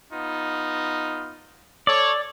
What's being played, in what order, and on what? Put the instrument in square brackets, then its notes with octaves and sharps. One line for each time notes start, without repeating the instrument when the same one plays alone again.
[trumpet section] B3 D#4 F4
[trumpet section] A4 C#5 [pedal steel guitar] D5